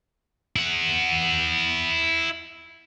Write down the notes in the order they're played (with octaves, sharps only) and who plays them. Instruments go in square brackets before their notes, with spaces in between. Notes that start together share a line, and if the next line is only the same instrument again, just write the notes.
[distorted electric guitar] E4 F#5